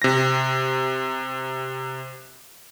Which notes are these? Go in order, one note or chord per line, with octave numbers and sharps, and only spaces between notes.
C3 A#6